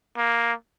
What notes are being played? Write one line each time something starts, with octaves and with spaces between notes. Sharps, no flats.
A#3